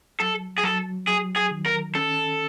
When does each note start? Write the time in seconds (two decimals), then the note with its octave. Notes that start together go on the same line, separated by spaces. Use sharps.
0.20 F#3 A4
0.58 G#4
0.63 F#3 A4
1.07 F#3 G#4
1.36 G#4
1.51 D#3
1.66 A#4
1.95 C#4 A4